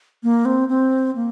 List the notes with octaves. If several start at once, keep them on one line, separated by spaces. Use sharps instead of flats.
A#3
C4
C4
A#3